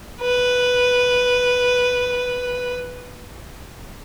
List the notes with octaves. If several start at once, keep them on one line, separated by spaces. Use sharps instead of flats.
B4